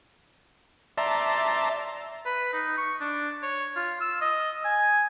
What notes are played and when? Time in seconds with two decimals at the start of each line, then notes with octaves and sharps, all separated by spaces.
0.98 D5 E5 A5 A#5 C6
2.25 B4
2.53 D#4
2.77 C#6
3.01 D4
3.42 C#5
3.76 F4
4.00 E6
4.21 D#5
4.65 G#5